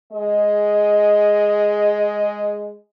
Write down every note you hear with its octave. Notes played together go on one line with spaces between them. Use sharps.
G#3 G#4 D#5